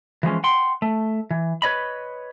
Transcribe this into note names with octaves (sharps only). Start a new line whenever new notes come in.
E3 F3 G#3 C#4
F#5 G5 C6
A3
E3
B4 C#5 D#5 B5